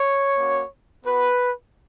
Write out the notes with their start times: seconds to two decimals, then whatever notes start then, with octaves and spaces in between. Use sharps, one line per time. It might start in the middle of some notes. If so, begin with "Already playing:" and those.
Already playing: C#5
0.38 A#3 C#4 F#4
1.04 B3 F#4 B4